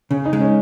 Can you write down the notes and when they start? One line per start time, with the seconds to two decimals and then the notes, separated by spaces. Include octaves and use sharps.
0.11 C#3 C#4
0.25 D#4
0.33 G#3
0.40 C#4